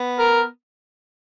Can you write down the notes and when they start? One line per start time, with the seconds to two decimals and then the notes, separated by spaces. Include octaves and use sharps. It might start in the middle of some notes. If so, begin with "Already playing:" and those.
Already playing: B3
0.19 A#4